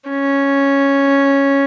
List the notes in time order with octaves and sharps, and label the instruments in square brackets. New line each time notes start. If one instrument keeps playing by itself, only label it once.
[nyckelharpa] C#4